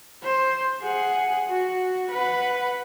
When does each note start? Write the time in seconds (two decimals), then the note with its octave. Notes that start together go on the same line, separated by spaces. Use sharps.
0.22 C5
0.80 G#4 F#5
1.48 F#4
2.10 B4 F#5